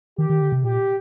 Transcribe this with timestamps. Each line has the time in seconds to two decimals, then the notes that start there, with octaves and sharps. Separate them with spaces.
0.18 D#3 G4
0.30 D#3
0.42 D3
0.52 C3
0.64 A#2 G4